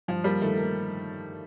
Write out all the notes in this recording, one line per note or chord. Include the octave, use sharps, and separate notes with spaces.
G2 F3
G3 A#3
D#3 A3
A#3